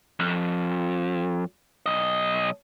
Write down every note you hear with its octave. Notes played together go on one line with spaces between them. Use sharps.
F2
B1 D#5